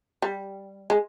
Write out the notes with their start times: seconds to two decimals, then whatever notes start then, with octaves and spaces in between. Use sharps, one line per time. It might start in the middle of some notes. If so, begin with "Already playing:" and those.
0.22 G3
0.90 G#3